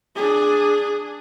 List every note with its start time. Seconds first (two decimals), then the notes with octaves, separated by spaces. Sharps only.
0.16 D4 G#4